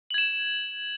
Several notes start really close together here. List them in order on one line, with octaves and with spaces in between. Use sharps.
F#7 G#6 E7